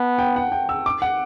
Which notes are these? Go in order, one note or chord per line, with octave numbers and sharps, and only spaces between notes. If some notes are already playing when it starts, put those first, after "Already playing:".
Already playing: B3 A5
G5
F#5
G5
E6
D6
F#5